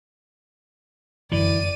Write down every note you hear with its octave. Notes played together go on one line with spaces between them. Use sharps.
F1 F#2 D3 E3 D5 D#7